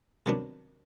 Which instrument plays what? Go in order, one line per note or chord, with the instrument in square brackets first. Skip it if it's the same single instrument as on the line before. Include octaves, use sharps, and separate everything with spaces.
[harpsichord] C3 D#3 F#3 B3 D4